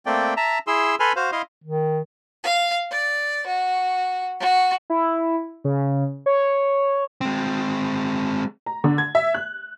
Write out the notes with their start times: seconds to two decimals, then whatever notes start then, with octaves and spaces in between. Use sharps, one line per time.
0.06 A3 A#3 C4 D5 G5
0.37 E5 A5 A#5
0.67 E4 G#4 C6 E6
1.00 A4 B4 G#5 B5 C6 F6
1.16 F#4 C5 F5
1.32 E4 D#5 F5 C6
1.64 D#3
2.44 F5
2.91 D5
3.46 F#4
4.40 F#4
4.90 E4
5.64 C#3
6.26 C#5
7.21 G#3 C4
8.66 A#5
8.84 D3
8.98 G#6
9.15 E5
9.34 F#6